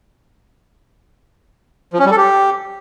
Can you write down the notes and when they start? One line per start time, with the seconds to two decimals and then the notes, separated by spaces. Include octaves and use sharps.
1.93 F3
1.99 C#4
2.05 G3
2.11 A4
2.17 G4